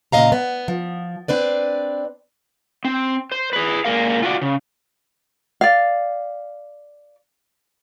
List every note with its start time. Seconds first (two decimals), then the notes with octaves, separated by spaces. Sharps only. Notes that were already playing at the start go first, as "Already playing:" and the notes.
0.12 A#2 C#3 D#5 F5 A#5
0.32 B3
0.68 F3
1.28 C4 D4 B4 D5
2.85 C4
3.32 C5
3.53 G#4 B4
3.85 A#2 D#3 G#3 A#4 F5
4.23 F4 F#4 B4 D5
4.42 C#3
5.61 D5 F5